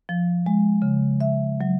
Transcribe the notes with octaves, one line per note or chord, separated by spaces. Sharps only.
F3
G#3
C#3
E5
F#3